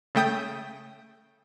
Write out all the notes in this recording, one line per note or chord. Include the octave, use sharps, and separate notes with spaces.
C#3 A3 G5 D#6 G6